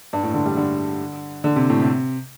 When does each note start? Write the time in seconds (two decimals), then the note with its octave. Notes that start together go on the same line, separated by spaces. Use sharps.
0.13 G2
0.23 A2
0.34 D3
0.46 G3
0.57 D3
1.44 D3
1.56 C3
1.70 A2
1.81 C3